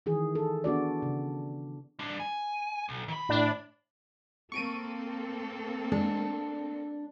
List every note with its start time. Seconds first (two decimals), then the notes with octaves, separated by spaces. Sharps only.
0.06 D#3 E3 G#4
0.35 A4
0.64 B3 D4 F#4 D5
1.02 C#3
1.99 G3 D4
2.20 G#5
2.89 B1
3.08 D#3 B5
3.29 A2 D4
4.52 A#3 C4 A4 C#6 D7 D#7
5.92 G#3 D4